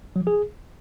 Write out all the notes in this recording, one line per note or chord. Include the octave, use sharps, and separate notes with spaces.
F#3
F3
G#4